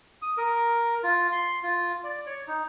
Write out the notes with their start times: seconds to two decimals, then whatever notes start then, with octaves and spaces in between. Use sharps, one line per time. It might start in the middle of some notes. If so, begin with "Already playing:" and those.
0.22 D#6
0.38 A#4
1.03 F4
1.32 C6
1.63 F4
2.04 D5
2.26 C#5
2.48 D#4